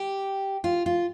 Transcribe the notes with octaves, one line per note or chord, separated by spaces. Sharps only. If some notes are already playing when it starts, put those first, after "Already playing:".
Already playing: G4
F4
F4